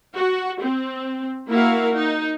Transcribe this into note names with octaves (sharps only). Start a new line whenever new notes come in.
F#4
C4
A#3 E4 F#4 A#4 E5 F5
D#4